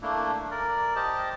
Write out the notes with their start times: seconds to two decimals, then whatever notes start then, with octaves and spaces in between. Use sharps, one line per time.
0.02 A3 A#3 D4 E4
0.51 A#4 D5
0.96 G4 C5 D#5 A5